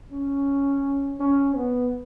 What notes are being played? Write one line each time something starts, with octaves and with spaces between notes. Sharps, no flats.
C#4
C#4
B3